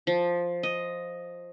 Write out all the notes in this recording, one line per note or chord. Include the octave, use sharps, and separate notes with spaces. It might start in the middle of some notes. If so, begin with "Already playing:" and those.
F3
D#5